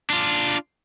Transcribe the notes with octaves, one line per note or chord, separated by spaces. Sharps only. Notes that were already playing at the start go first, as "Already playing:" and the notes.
D4 F4